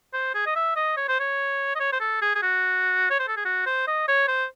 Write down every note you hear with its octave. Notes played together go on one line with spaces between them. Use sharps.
C5
G#4
D#5
E5
D#5
C#5
C5
C#5
D#5
C#5
C5
A4
G#4
G#4
F#4
C#5
C5
A4
G#4
F#4
C5
D#5
C#5
C5